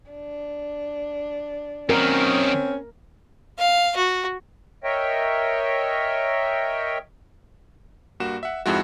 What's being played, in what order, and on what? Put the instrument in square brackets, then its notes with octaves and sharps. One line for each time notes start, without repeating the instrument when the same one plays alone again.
[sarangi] D4
[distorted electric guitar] F#2 D#3 [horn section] C4 C#4 [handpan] A#4
[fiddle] F5
F#4
[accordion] A#4 C#5 D#5 E5 G5
[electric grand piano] G2 A#3 F#4 E7
E5 F#5
F2 G#2 G#3 E4 F#4